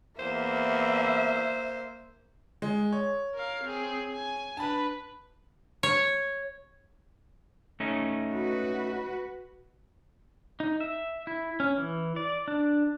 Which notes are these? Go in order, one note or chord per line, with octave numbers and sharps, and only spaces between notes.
E2 A#3 C5 E5
G#3
C#5
A#4 F5
C4 G#4
G#5
D4 B4 A5 B5
C#5
A3 C#4 D#4
F#4 B4
D#4
E5
E4
C#4
E3
D5
D4